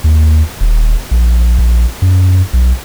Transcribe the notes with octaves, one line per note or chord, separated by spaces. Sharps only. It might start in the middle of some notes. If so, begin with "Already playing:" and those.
D#2
D#1
A#1
A#1
F#2
B1